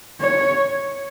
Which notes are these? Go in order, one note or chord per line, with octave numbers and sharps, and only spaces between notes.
C#5